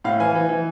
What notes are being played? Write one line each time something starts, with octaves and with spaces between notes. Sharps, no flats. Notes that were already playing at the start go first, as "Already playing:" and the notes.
A2 F5
E3 G#5
E3
E3